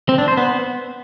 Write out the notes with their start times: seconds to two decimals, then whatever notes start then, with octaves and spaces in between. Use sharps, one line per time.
0.09 C4
0.18 D4
0.28 C5
0.37 B3